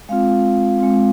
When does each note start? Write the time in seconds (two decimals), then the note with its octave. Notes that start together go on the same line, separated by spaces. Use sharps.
0.09 G#3 C4 F4 F5
0.79 G#3 C4 F4